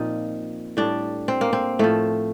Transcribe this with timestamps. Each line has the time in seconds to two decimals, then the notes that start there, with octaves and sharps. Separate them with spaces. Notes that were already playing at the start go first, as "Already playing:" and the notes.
Already playing: A#2 F3 C4 D#4
0.77 A2 G3 D4
1.28 C4
1.41 A#3
1.53 C4
1.79 A2 F3 A3